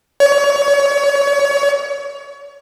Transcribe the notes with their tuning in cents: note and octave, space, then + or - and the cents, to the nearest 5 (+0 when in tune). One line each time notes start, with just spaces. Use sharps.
C#5 +30